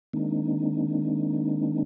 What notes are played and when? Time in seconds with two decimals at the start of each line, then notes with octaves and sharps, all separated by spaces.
0.13 D#3 G#3 A#3 C4 D4 D#4